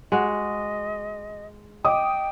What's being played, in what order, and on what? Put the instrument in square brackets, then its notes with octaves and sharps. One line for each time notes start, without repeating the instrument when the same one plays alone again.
[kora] G#3 F#4 [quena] D#5
[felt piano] D#5 D6 D#6 [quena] G5